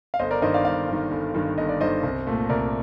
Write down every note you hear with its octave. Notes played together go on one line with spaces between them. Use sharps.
F5
G1 C5 D#5
A#4 D5
G2 D#3 C5 D#5
D5 F5
G1 D5 F5
G2 D#3
G1
G2 D#3
G1 D#5
D5
G2 D#3 C5 D#5
C2
A#2 A3
C2 A#4 D5